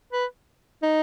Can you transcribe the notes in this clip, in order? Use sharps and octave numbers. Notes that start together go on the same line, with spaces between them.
B4
D#4